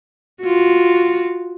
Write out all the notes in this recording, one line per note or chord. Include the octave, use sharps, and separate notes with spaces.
F4 F#4